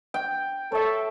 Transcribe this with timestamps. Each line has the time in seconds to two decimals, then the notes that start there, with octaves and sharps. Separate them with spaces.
0.14 G5
0.72 A4 C#5 E5